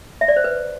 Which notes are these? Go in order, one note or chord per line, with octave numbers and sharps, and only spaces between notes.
E5
D5
C5
B4